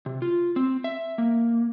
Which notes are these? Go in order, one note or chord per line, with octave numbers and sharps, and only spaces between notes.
C3
F4
C4
E5
A#3